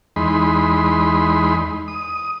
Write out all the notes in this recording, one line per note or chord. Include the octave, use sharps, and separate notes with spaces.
E2 G#3 D#4 B5 C6
D#6